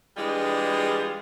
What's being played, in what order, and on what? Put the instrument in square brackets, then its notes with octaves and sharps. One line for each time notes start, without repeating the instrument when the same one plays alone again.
[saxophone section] E3 G3 G#3 D4 F4 G#4